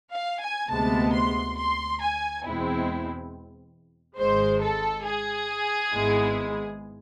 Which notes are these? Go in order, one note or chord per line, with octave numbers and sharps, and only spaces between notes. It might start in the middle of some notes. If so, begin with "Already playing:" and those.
F5
G#5
D2 C3 G#3 B3 A5
C6
C6
G#5
E2 B2 G#3 C4 E4
G#1 G#2 G#3 C5
A4
G#4
G#1 G#2 G#3 B3 E4